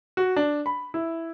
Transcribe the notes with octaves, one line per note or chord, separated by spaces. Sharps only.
F#4
D4
B5
E4